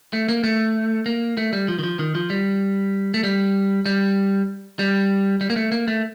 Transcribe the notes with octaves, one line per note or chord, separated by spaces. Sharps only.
A3
A#3
A3
A#3
A3
G3
F3
D#3
F3
D#3
F3
G3
A3
G3
G3
G3
G3
A#3
A3
A#3
A3